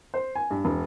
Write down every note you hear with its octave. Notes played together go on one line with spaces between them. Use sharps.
C5
G#5
G2
E1